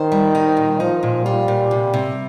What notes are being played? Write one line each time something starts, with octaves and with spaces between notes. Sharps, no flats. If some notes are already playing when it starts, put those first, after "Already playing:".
Already playing: D#3 C5
G3
D#4
A#2
F3 D#4
A#2
G3 F4
A#2
C3
C3